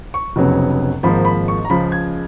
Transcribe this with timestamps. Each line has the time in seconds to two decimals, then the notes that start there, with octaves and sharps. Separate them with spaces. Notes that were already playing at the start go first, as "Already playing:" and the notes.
0.14 C#6
0.36 F1 F2 C#3 F#3 B3
1.03 G#1 G#2 F3 A#3 B5
1.25 B5
1.48 C#6
1.65 A#5
1.70 C#2 C#3 F3 B5
1.92 G#6